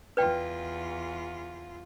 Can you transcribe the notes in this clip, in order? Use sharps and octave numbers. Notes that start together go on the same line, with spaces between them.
E2 F4 B4 D5 G5